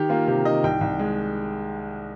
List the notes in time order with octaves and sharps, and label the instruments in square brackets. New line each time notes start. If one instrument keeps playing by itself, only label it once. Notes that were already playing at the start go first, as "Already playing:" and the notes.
Already playing: [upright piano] D#3 G4
A#3 F4
C3 G4
D#3 D#5
C2 G5
C2
G#3